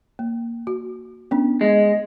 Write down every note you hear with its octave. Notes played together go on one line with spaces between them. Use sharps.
A#3
F#4
B3 C#4 D4
G#3